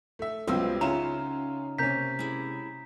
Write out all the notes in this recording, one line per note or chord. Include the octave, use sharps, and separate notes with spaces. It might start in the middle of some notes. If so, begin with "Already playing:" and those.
A3 E5
C#2 C3 F#3 G3 B3 C4 F4 E6
C#3 C#4 D#4 F4 E5 F#5 A#5 E7
C3 A#3 C#4 A#5 G6 B6
G#3 E4